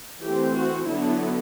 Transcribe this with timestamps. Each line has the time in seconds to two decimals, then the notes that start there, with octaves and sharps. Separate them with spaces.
0.23 E3 A3 C4 G4
0.56 F#4
0.89 D3 F#3 B3 D4 E4